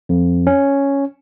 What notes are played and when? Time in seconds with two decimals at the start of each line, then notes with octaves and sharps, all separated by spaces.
0.09 F2
0.47 C#4